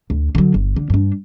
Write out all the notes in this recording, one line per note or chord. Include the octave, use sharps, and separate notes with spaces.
D2
D3 F#3
G1
D3
G2 D4